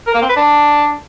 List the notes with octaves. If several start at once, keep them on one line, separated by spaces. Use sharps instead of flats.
A#4
A#3
C4
B4
D4